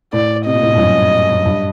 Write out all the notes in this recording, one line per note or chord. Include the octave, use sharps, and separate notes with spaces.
A2 D5
C3 D#5
A#2
A2
A#2
G2
F#2
F#2
G2